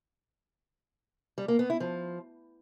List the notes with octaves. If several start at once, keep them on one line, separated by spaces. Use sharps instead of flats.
G3
A#3
B3
E4
F3